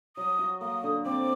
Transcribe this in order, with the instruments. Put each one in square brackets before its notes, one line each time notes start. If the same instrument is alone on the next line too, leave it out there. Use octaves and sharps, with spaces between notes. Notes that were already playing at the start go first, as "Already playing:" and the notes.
[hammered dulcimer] F#3 [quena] D#6
[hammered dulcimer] F#4
[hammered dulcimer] A#3 [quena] D#6
[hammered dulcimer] D3
[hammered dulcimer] C4 [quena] D6